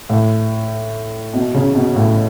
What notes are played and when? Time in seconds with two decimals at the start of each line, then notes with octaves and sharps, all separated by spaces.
0.10 A2
1.34 B2
1.54 C#3
1.75 B2
1.96 A2